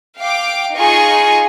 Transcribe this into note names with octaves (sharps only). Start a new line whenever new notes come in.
F5 G5 D6
D#4 F4 G#4 G#5 C#6